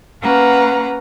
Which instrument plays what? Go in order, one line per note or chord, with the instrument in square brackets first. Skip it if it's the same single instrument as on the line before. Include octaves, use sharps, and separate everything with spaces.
[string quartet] A#3 C#4 B4 F5 F#5 A#5